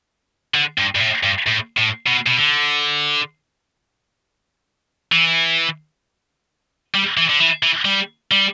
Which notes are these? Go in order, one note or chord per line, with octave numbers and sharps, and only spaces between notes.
D3
G2
G2
A2
G2
A2
A2
B2
B2
D3
E3
G3
E3
D3
E3
E3
G3
G3